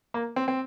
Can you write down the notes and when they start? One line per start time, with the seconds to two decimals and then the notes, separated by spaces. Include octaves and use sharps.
0.14 A#3
0.36 C4
0.48 C4